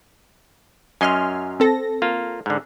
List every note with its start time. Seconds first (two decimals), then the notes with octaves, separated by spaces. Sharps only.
1.01 F#2 C#4 D#5 G#5 C6 F6
1.60 C4 A4 A#6
2.02 A#3 F4
2.46 G#2 D3